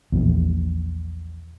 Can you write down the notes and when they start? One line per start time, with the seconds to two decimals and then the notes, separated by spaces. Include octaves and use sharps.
0.12 A#1 E2